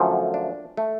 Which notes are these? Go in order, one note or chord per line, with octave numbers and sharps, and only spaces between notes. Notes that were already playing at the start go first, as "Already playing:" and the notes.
Already playing: F#2 D3 F3 A3
D4
A3